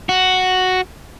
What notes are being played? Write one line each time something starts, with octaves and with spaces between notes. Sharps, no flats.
F#4